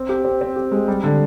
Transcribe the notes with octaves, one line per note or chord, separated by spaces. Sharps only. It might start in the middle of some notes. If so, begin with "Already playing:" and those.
Already playing: C4
G4
C4
C4
G4
G#3
G3
D3